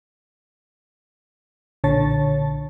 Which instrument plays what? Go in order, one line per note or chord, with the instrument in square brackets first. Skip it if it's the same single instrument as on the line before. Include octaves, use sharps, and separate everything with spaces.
[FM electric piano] B1 A#2 D3 C#5 A5 A6